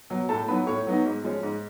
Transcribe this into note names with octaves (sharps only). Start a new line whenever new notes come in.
B2 F#3
A2 A4 A5
F#3 B3 D#4 B4 B5
A2 C#5 C#6
F#3 B3 D#4
G#2
F3 G#3 C#4
G#2